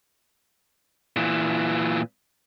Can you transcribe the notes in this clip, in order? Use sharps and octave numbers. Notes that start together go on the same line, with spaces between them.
A#2 E3